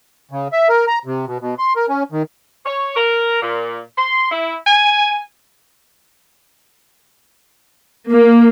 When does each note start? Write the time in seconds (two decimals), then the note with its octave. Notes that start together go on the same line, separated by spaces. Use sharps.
0.31 C#3
0.53 E5
0.69 A#4
0.87 A#5
1.05 C3
1.27 B2
1.41 B2
1.58 C6
1.76 A#4
1.89 C#4
2.12 D#3
2.65 C#5
2.95 A#4
3.42 A#2
3.96 C6
4.30 E4
4.66 G#5
8.09 A#3